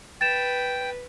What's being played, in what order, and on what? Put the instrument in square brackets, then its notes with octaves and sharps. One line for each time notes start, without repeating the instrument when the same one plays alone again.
[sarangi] B4 [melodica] G5 [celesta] A6 E7